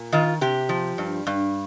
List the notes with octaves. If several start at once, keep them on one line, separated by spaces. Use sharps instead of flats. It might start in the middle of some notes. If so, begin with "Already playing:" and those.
Already playing: A#2
D#3 F4
C3 G4
F3
G2
G2